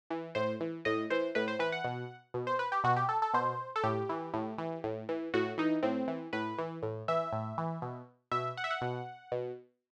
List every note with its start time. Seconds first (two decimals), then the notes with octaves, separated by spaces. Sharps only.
0.10 E3
0.35 A2 C5
0.60 E3
0.85 A2 D#5
1.10 E3 C5
1.35 A2 B4
1.48 C5
1.59 E3 B4
1.72 F#5
1.85 B2
2.34 B2
2.47 C5
2.59 B4
2.72 G4
2.84 B2 F#4
2.96 G4
3.09 A4
3.22 A4
3.34 B2 C5
3.76 A4
3.83 A2 G4
4.09 E3
4.34 A2
4.58 E3
4.84 A2
5.09 E3
5.34 A2 F#4
5.58 E3 D#4
5.83 A2 C4
6.08 E3
6.33 A2 B4
6.58 E3
6.83 A2
7.08 E3 E5
7.33 A2
7.58 E3
7.82 B2
8.31 B2 E5
8.57 F#5
8.64 E5
8.71 F#5
8.81 B2
9.32 B2